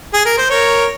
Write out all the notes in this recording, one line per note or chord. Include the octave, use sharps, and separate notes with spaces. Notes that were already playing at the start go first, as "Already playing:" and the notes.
G#4
A#4
C5
A#4 C#5